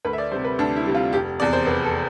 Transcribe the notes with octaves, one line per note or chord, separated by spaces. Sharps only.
D2 B4
E5
D5
C3 G3 C5
B4
D2 D4
E4
C3 G3
F4
F1 G4
E2 C3 D5
C5
F1 B4
A4